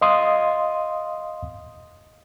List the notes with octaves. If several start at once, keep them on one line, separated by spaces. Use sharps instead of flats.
D#5 F5 C6 D#6